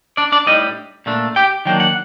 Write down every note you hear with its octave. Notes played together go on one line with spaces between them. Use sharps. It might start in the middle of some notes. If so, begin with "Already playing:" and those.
D4 D5
D4 D5
A2 G3 D4 D#4 D#5
A#2 A3 D4
G4 G5
D#3 F#3 A#3 D4 G5
F#5